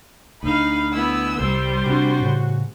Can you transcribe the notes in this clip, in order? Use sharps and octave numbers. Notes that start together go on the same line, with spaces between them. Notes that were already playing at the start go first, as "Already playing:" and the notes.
D2 D3 D#4 F5 B5
B3 E4 E6
C2 G3 C5
C3 D4 F#4
A2 C#3